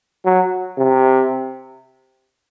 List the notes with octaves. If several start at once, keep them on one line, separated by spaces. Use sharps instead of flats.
F#3
C3